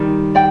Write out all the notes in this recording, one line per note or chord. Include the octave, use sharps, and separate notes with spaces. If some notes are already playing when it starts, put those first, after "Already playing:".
Already playing: D#3 G3
D5 G5